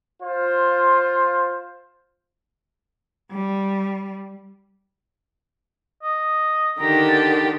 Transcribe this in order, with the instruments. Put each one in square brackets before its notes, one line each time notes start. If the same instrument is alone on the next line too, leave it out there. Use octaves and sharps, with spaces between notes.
[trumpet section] F4 C5
[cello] G3
[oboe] D#5
[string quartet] D3 D#3 G4 [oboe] A#5
[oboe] A5